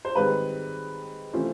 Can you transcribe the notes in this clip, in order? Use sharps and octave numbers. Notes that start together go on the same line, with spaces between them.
C5
G#2 D#3 G3 C4 B4
C3 E3 A3 C#4 F4 C5